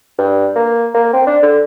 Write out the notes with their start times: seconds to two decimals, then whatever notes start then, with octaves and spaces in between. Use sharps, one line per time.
0.19 G2
0.56 A#3
0.94 A#3
1.13 C4
1.27 D4
1.43 D3